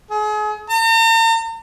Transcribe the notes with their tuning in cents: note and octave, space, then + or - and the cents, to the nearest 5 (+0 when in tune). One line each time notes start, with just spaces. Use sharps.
G#4 +35
A#5 -45